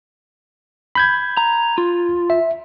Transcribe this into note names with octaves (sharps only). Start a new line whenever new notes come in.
B5 G6 G#6
A#5
F4
E5